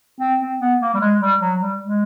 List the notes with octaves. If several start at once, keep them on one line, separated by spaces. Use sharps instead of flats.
C4
C4
B3
A#3
G3
G#3
G3
F#3
G3
G#3